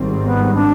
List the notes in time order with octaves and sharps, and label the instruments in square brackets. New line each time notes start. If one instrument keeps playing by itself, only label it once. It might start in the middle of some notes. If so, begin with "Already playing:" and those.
Already playing: [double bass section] G#1 G#2 G3 C4
[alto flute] B3
D4